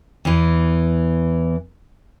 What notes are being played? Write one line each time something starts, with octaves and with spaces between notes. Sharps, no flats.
E2 E3